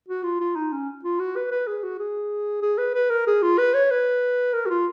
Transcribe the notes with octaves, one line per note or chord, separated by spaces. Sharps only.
F#4
F4
F4
D#4
C#4
F4
F#4
B4
B4
G#4
F#4
G#4
G#4
B4
B4
A#4
G#4
F4
B4
C#5
B4
A#4
F#4
F4